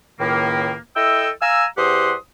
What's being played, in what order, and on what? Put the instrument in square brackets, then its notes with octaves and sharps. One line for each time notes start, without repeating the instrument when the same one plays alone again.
[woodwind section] C#2 A2 D#3 A#3
E4 A4 D#5 G5 E6
F5 G#5 A#5 E6
E2 G4 C5 F#5 C6 D#6